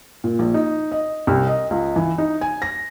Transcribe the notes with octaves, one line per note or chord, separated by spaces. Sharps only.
A#2
A#1
D#4
D#5
C2
D#5
C#2
E3
D#4
G#5
A#6